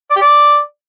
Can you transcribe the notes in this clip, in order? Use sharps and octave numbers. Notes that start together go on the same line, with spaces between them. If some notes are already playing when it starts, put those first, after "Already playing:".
D5
G4
D5